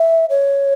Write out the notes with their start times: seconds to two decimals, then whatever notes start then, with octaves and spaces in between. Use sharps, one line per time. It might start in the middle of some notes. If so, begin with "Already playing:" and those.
Already playing: E5
0.30 C#5